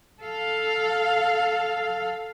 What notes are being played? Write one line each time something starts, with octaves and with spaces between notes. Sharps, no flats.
A4 F5